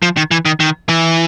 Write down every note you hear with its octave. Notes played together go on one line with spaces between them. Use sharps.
F3
D#3
E3
D#3
D#3
E3